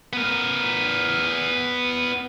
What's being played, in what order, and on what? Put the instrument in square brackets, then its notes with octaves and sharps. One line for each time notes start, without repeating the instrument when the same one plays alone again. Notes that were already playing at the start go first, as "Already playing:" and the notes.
[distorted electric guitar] B3 A#4